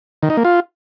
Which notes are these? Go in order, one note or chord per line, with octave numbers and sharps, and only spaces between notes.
D#3
D#4
A#3
F4